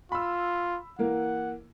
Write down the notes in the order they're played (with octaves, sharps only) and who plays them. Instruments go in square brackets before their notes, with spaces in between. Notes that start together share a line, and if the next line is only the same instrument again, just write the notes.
[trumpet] F4 [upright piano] B5 E6
[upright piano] E3 A#3 A#4 [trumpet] F#5